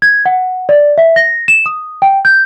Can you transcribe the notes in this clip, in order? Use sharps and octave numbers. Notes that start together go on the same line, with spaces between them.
G#6
F#5
D5
E5
A#6
E7
D#6
G5
G6